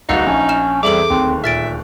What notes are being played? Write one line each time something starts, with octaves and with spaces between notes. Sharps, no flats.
D1 C2 D#4 F#4 F5 F#5 E6
A#1 C#4
F6 E7
E2 G3 C4 G#4 A4 E5 D6 F#7
D1 D#2 C4
A#2 E5 F6 A6 D7